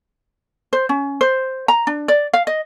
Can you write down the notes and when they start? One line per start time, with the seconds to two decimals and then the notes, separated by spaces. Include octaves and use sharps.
0.73 C5
0.89 C#4
1.21 C5
1.68 A#5
1.87 D4
2.08 D5
2.33 F5
2.47 D#5